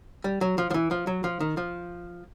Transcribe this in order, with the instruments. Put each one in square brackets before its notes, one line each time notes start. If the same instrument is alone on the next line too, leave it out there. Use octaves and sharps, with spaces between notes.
[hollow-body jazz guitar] G3
F#3
F3
F3
E3
F3
F#3
F3
D#3
F3